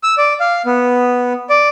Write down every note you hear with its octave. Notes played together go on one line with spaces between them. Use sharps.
E6
D5
F5
B3
D5